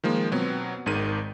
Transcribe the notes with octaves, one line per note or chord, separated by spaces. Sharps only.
D#3 F3 G#3 A#3
B2 F#3 B3 C4
G#1 G#2 D#3 D#7